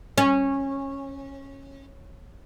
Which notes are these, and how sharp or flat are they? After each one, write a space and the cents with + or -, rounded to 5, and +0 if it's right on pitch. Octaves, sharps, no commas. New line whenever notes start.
C#4 -15